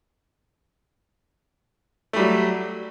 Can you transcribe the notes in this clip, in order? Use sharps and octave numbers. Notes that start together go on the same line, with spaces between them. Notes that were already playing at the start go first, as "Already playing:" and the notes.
F#3 G3 A3